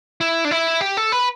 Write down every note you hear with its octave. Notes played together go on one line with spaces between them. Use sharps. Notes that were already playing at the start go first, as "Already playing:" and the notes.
E4
D4
E4
G4
A4
B4